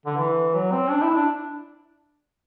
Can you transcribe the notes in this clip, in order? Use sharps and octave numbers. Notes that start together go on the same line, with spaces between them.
D3
E3
F#3
C4
D4
E4
D4